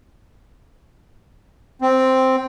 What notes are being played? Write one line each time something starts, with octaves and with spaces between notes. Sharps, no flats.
C4